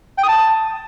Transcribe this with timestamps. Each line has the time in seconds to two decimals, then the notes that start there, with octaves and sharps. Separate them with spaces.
0.18 G5
0.23 D#6
0.28 A5